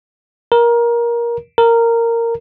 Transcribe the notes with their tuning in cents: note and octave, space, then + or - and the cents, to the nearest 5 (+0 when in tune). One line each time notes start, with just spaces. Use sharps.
A#4 +20
A#4 -10